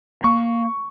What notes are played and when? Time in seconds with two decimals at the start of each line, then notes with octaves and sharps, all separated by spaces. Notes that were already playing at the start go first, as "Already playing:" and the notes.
0.24 A#3 C#6